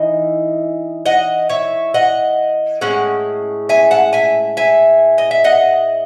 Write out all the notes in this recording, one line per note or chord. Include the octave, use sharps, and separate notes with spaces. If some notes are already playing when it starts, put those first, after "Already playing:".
Already playing: E3 D#4 D#5
D#5 F#5
C#5 E5
D#5 F#5
A2 G#3 C#4 F#5
E5 G#5
F#5 A5
E5 G#5
E5 G#5
D#5
E5
D#5 F#5